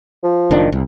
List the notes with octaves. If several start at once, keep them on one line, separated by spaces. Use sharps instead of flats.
F3
F#1 D#3 D4
C2